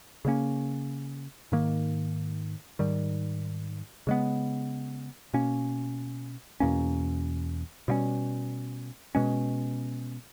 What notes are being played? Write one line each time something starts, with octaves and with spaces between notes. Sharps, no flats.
C#3 G3 A#3 C#4
G#2 D#3 A#3
G#2 D#3 G3
C#3 G#3 B3
B2 A#3 C#4
E2 B2 A#3 C#4
B2 G3 A#3 C#4
B2 G#3 C#4